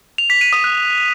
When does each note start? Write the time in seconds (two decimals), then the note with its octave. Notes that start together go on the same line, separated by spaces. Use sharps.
0.18 F7
0.30 B6
0.41 D#7
0.53 D#6
0.64 F#6